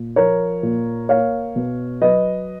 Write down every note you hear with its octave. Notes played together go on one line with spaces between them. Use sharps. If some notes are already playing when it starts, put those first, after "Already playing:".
Already playing: A#2
F3 A#4 C#5
A#2
A#3 C#5 F5
B2
F#3 B4 D#5